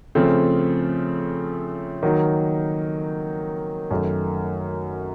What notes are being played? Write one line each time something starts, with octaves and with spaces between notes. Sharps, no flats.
C#3 F3 A3 C4
D#3 F#3 A#3 D#4
F#2 D#3 A3